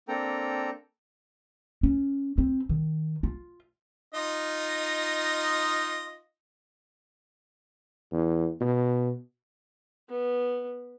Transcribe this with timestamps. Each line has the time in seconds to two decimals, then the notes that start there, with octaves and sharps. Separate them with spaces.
0.08 A#3 C4 D4 A4 G5 A#5
1.83 C#4
2.38 C4
2.69 D#3
3.23 F4
4.14 D#4 F4 D#5
8.12 E2
8.61 B2
10.09 B3